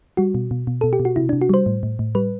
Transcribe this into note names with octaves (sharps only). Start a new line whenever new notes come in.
G3 F#4
B2
B2
B2
B2 A4
G4
B2
F#4
C3 E4
C3 D4
F#4
G3 C5
A2
A2
A2
G3 B4